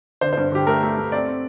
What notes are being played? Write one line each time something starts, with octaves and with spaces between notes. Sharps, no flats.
D3 C5
C5
G2
D3 G4
A3 A#4
A3
A3
C4 D5
C4